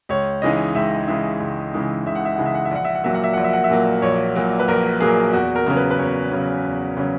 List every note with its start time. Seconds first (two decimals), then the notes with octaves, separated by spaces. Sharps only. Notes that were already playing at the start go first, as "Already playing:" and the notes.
0.09 C#2 C#5
0.42 C#3 E3 G#3 D#4 D#5
0.75 C#2 E5
1.08 C#3 E3 G#3 D#4 E5
1.40 C#2
1.73 C#3 E3 G#3 D#4
2.06 C#2 E5
2.15 F#5
2.25 E5
2.36 C#3 E3 G#3 D#4 F#5
2.46 E5
2.55 F#5
2.65 E5
2.71 A#1 F#5
2.85 E5
2.95 F#5
3.04 A#2 F#3 A#3 E5
3.15 F#5
3.24 E5
3.33 A#1 F#5
3.44 E5
3.53 F#5
3.64 E5
3.70 A#2 F#3 A#3
4.02 A#1 C#5
4.36 A#2 F#3 A#3
4.59 B4
4.68 A#1 A#4
5.00 A#2 F#3 A#3 G#4
5.33 E2 F#4
5.56 A#4
5.66 C#3 F#3 C#4 A#4
5.77 B4
5.91 B4
5.99 E2 C#5
6.31 C#3 F#3 C#4
6.65 E2
6.97 C#3 F#3 C#4